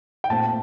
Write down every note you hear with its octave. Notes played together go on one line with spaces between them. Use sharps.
G5
A#2 A3 C4 A5